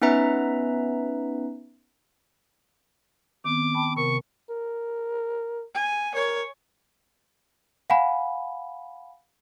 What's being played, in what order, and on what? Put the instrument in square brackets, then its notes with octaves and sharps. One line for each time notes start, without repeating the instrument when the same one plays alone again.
[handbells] B3 C#4 D#4 B4 E5 A#5
[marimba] D#3 B3 C4 [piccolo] D6
[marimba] G5 A5 B5
[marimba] C3 A#4 [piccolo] C#6
[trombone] A#4
[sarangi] G#5
[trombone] A#4 [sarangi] C#5
[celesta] F5 F#5 G#5 B5